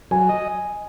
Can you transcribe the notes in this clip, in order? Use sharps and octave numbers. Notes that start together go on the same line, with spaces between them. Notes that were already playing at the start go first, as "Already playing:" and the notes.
F#3 G#5
D#5